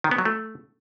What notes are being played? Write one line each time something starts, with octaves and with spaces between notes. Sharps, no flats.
D#3
B3
F#3
A3